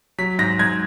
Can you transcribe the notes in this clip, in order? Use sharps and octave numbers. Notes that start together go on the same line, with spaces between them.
F#3 B6
G#2 A#6
G#2 G#6